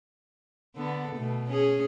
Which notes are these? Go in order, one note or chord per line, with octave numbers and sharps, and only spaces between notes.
D3 B3 A4
B2 A3
C#4 G#4